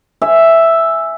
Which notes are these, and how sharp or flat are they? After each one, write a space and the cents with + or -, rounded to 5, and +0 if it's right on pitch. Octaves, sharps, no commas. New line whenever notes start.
E5 +0 G#5 +0